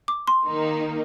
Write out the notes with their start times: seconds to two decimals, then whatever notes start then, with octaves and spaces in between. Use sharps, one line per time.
0.08 D6
0.27 C6
0.46 D#3 A#3 D#4